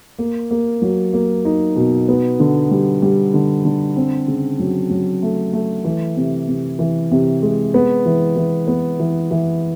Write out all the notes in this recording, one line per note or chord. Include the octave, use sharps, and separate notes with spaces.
A#3
A#3
F#3
A#3
D#4
B2
B3
D3
G3
G3
D3
D3
C4
C#3
F#3
F#3
A3
A3
E3
C3
C3
E3
C3
G#3
B3
E3
E3
B3
E3
E3